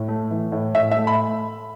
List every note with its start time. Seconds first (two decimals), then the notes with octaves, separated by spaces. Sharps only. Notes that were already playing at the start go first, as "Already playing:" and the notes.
Already playing: A2
0.08 A3
0.31 E3
0.52 A2
0.75 A2 E5
0.91 E5
0.97 A3
1.07 B5